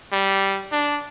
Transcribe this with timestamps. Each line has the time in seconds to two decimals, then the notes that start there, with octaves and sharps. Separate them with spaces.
0.12 G3
0.72 D4